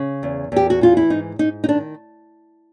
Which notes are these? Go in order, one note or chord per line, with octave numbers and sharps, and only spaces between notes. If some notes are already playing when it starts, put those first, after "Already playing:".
Already playing: C#3
E2
E2 G4
F#4
E3 F4
E4
G#2 D#4
G#2 D#4
D#4
D#3 D4